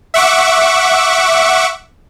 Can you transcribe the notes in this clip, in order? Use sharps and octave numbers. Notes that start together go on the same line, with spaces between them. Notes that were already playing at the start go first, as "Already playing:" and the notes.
E5 F#5 C#6 D6